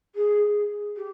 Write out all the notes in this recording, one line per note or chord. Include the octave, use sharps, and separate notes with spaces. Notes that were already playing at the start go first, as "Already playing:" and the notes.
G#4
G4